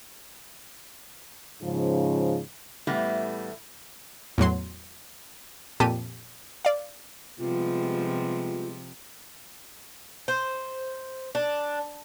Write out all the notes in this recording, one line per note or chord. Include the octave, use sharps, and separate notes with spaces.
G#2 C#3 F3
A2 E3 G3 A3 B3
E2 A2 F#3 C6
F2 A#2 G4 A5 B6 D#7
D5 F5
C3 F3 G3 G#3 B3 F4
C5
D4